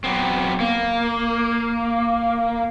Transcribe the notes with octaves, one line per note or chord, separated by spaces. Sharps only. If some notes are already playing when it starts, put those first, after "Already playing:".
F#3 B3 C4
A#3